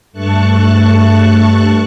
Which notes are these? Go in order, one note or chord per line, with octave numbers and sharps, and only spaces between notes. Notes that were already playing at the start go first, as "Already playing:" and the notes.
G2 A3 A5 C#6 F#6